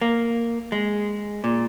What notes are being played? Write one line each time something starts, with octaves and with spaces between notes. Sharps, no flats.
A#3
G#3
A#2